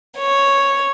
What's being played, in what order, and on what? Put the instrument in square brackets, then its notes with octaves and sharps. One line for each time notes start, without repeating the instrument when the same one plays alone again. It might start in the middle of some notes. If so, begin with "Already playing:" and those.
[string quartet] C#5